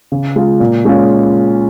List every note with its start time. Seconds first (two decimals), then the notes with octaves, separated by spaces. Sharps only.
0.12 C#3
0.36 G#3 F4
0.60 A#2
0.85 G#3 C#4 F4